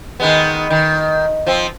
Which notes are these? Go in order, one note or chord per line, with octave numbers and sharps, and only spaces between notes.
D#3 G#3 B3
D#3
F3 C4